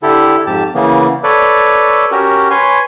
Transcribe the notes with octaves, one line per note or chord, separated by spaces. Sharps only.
D3 E4 G4 A4
F2 G#2 G4 A5
C#3 E3 A#3 B3
A4 B4 C#5 D5
C#4 F#4 G4 A#4
B4 C#5 G#5 C6